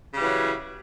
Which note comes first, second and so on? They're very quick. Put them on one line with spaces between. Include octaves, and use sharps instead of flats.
C#3 G3 E3 F#3